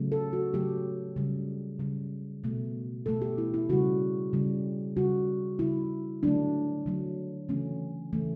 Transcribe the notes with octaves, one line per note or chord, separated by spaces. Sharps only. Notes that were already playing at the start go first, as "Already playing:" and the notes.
Already playing: C#3 F#3 A3
A4
F#4
C#3 F#3 A3 G4
C#3 G3
C#3 G3
B2 A3
B2 A3 A4
G4
E4
E4
C#3 G3 F#4
C#3 G3
C#3 G3 F#4
C#3 G3 E4
D3 F#3 A3 D4
D3 F#3 A3
C#3 E3 A3 C#4
C#3 E3 A3